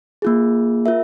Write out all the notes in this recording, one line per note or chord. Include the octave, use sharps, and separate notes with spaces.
A#3 F4 G#4
F4 A#4 E5